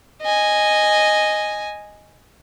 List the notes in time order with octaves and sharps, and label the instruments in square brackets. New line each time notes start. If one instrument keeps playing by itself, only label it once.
[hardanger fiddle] D#5 G#5